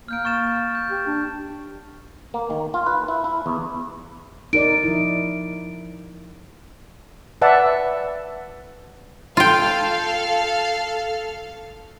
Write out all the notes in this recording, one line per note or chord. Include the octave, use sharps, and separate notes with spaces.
A#3 F6 G6 D7
C#6 A6 E7
G6
G4
D4
A#3
D#3
F4
B4
E4
E4
E2
D#4 A#4 D5 D7
F3 E4
B4 D5 E5 F#5 A5
F4 A4 F5 G5